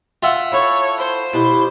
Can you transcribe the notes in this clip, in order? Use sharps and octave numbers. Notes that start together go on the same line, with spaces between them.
F4 E5 F#5
E4 A4 C#5
C5
B2 E4 G4 B4